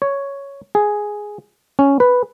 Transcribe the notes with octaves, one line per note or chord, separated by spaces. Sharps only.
C#5
G#4
C#4
B4